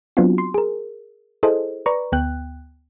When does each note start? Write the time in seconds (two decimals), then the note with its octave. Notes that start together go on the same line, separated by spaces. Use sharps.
0.17 F#3 B3 C4 D4 F4 F#4
0.38 C6
0.54 G#4 A#4
1.43 E4 G#4 A4 C5 D#5
1.86 B4 D5 A#5 C#6
2.12 D2 B3 G5 F#6